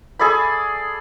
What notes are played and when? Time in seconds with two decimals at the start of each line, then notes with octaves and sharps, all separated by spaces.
0.19 G#4 A4 D5 B5